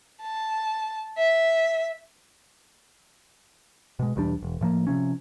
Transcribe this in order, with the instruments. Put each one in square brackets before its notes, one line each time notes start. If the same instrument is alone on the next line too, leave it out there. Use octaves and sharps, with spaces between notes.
[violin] A5
E5
[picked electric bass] B2 G#3
B1 E2 G3 D4
E1
A2 F3 A#3
C3 F3 C#4